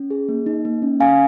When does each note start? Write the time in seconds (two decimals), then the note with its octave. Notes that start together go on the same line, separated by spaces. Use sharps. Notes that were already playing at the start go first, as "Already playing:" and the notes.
Already playing: C#4
0.11 G#4
0.29 A#3
0.46 D#4
0.65 A#3
0.82 C#4
1.00 C#4 F5 G#5